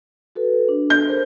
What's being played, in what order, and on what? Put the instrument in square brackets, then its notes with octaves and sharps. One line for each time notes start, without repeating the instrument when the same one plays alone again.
[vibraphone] F#4 A4 B4
D4
[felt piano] G6
[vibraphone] G#4 A#4 C5